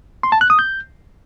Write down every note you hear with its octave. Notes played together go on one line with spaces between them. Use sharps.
C6
A5
F#6
D#6
G6